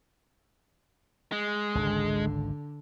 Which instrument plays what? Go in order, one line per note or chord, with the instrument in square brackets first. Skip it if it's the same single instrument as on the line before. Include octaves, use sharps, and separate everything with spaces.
[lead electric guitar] G#3
[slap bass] G#1 C#2 G#2 [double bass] D3